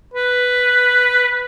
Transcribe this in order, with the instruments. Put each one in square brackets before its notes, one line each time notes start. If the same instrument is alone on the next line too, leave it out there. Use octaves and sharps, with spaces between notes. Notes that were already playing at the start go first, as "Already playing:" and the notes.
[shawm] B4